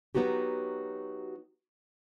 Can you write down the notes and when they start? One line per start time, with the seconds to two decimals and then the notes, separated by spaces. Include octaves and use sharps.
0.15 F#3 A#3 B3 D#4 F#4 G4